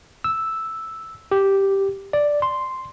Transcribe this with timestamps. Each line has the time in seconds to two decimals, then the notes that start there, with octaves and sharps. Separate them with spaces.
0.24 E6
1.31 G4
2.13 D5
2.42 C6